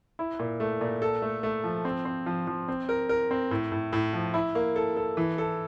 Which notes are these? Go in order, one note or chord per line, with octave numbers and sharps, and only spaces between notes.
E4
A#2
A3
A#2
A4
A3
A3
F3
C4
C4
F3
F3
C4
A#4
A#4
C4
A2
A2
A2
F3
E4
A#3
A4
A4
E3
A4